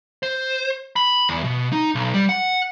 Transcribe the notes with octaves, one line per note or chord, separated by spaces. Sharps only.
C5
B5
E2
B2
D#4
B1
G3
F#5